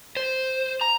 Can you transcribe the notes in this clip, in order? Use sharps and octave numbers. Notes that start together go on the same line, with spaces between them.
C5
A#5